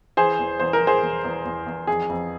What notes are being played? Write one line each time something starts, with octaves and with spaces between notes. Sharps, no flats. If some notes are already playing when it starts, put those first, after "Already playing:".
E3 G#4 C5
E2
E2 C5
A#4
E3
G#4 C5
E2
E2
E2
E2
F2 G#4
F2